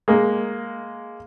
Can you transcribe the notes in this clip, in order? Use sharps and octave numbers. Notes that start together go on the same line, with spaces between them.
G#3 A#3